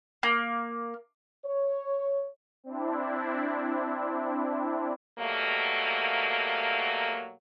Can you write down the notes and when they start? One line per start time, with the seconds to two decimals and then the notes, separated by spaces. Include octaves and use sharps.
0.23 A#3
1.45 C#5
2.64 C4 D4 E4
5.19 B2 F#3 G3 A3 A#3